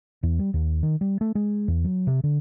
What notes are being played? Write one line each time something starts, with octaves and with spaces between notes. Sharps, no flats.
E2
G3
D#2
D#3
G3
A3
G#3
E2
F#3
C3
D3